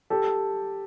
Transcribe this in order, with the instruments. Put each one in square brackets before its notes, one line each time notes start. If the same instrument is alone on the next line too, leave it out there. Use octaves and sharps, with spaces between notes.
[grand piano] G4 A4